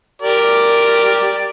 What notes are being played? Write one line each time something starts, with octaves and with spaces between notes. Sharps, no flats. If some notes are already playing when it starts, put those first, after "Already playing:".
G4 A#4 D5